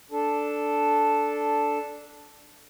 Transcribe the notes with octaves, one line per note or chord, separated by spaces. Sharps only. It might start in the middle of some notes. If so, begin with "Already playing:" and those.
D4 A4